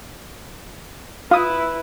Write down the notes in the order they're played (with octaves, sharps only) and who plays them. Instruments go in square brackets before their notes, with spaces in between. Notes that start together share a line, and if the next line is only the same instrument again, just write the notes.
[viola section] E4 B4 [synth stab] F4 D#6